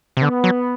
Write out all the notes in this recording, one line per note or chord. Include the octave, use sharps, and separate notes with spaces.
C3
D3 B3
F#3